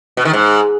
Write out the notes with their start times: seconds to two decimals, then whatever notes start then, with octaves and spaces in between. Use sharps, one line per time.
0.17 B2
0.25 D#3
0.33 G#2